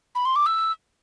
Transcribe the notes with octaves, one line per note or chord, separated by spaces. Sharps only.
B5
C6
D6
E6